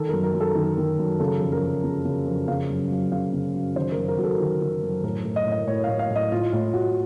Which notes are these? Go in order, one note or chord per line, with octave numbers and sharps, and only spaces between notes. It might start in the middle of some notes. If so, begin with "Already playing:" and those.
Already playing: D#3 A4
F#2 A#4
A#4
F#2
A4
D#3
D#3
F#2
C#3 A4
F2
A#4
F2
C#3
C#3
F2
C#3 F5
F#2
F#2
C#3 F5
C#3
F#2
D#3 C5
A#4
F#2
A#4
F#2 F#4
A4
D#3
D#3
F#2
A2 A#4
A2
D#5
A2
D#5
A2 C#5
A2 F5
F5
A2 D#5
A2 F4
A2 F4
A2 F#4